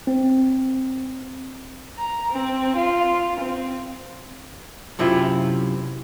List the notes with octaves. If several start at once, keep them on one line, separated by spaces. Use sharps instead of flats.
C4
A#5
C4
F4
C4
F#2 C3 C4 E4 F4